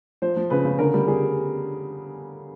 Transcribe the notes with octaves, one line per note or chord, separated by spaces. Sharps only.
F3 C5
F3
C#3 B4
C#3
D3 A#4
G3
G3 G#4